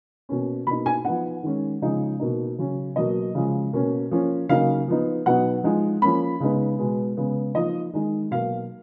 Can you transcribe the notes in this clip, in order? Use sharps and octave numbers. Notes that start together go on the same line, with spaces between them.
B2 A#3 C#4
B2 A#3 D#4 B5
G#5
F3 B3 D#4 F#5
D#3 G#3 C#4
C#3 F3 G#3 D#4
B2 A#3 D#4
C#3 F#3 C#4
B2 F#3 A#3 D#5
C#3 F3 G#3
B2 A#3 C#4
F3 A#3 C#4
C#3 F#3 A#3 D#4 F5
F3 B3 D#4
B2 F#3 B3 D#4 F#5
F3 G#3 D#4
F3 A#3 C#4 B5
C#3 G#3 B3 D#4
B2 G#3 B3
C#3 G#3 B3
F3 A#3 D#4 D#5
D#3 G#3 D#4
B2 F#3 A#3 F5